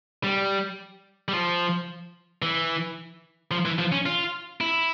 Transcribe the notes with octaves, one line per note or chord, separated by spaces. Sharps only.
G3
G3
F3
E3
F3
E3
F3
C#4
F4
E4